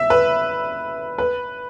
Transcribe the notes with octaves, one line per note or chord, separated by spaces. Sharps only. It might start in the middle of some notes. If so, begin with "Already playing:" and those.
Already playing: E5
B4
B4